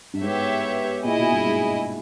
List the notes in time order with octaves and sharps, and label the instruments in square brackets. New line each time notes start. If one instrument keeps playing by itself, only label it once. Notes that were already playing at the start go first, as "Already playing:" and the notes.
[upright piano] G2
[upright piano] G#2 [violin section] B3 G4 C#5 E5
[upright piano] A#2 [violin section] E4 G#4 D#5
[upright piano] B2
G2 A#2
G#2